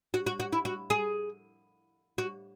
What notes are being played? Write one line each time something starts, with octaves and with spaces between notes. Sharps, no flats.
F#4
F#4
F#4
E4
F#4
G#4
F#4